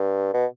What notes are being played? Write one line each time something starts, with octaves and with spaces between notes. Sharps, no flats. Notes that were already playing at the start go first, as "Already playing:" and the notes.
Already playing: G2
B2